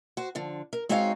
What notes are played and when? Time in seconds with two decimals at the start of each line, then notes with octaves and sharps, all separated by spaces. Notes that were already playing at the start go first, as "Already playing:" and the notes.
0.17 F#4 C5
0.35 D3 F3
0.73 A#4
0.89 G#3 C4 D#4 F#4 C#5 F5